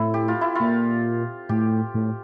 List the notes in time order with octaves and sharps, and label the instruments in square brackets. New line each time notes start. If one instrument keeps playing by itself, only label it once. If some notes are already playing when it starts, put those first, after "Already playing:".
Already playing: [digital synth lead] A2 [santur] C4 E4 A4
[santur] G4
F4
E4
[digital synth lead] A#2 [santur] F4
[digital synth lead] A2 [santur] G4
[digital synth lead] A2